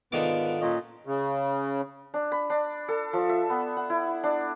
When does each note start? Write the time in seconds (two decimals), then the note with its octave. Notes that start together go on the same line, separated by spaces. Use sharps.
0.12 G#2 D3 D#3 B3 F4 A4 F5 D6
0.61 A#2 C#4 D#5
1.06 C#3
2.14 D4
2.32 B5
2.50 D4
2.88 A4
3.13 F3
3.29 E5
3.50 B3
3.77 F#5
3.90 E4
4.24 D4